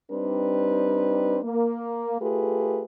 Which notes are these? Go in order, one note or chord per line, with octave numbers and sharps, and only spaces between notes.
G3 C4 D4 D#4 B4
A#3
A3 F4 G4 G#4 B4